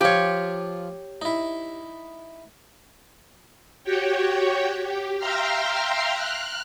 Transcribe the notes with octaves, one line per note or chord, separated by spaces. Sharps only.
F3 F4 G4 C#5
D#4 E4
F#4 G4 C#5 G5
G4
E5 F5 G5 A#5 C6 F6
F6 F#6